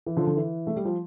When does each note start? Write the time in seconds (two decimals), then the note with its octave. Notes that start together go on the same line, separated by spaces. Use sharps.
0.06 E3
0.17 D3 F3
0.27 D3
0.37 E3
0.67 A3
0.76 G3
0.85 F3